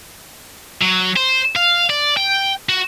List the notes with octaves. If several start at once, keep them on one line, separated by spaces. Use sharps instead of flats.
F#3
C5
F5
D5
G5
F#4